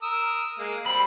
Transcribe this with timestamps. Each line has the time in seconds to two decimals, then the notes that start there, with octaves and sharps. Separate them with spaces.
0.03 A#4 D#6 E6
0.59 G#3 A#3
0.86 G3 C4 B5